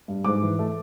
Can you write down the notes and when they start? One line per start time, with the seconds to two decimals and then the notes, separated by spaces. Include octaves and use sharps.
0.08 G2
0.24 G#2 D6
0.42 E3
0.59 A3